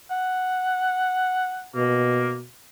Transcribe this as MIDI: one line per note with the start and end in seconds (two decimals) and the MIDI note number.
0.11 1.67 78
1.75 2.45 47
1.75 2.35 58